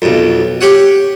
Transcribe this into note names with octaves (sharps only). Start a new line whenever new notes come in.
B1 F2
G4 C#5 F#5